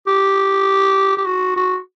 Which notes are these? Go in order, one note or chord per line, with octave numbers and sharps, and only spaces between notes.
G4
G4
F#4
F#4